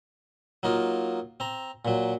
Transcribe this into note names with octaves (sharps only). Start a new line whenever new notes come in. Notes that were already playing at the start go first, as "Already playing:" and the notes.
F#3 A#3 D#4 F4
C4 A#5
A#2 F#3